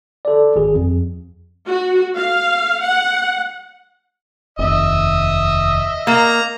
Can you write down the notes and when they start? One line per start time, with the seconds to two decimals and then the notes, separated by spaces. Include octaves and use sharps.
0.25 A4 D5
0.56 G#1 G#4
0.74 F2
1.67 F#4
2.16 F5
2.82 F#5
4.59 F1 D#2 D#5 E5 D#6
6.07 A#3 A#5